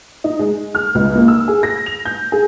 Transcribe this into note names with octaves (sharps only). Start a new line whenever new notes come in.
D#4
G#3
F6
C#2
A#3
E6
G#4
A#6
F7
G6
G#4